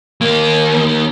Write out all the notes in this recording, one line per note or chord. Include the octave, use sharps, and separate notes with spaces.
D#2 A#3